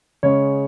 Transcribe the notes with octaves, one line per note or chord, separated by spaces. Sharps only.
C#3 G#3 C#4 C#5